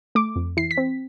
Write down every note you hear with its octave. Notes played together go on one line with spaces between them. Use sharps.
A3 D6
F2
E3 C7
B6
C4